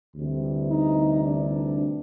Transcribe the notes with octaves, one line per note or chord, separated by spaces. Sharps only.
D2 C3 E3 G3
D#4
D4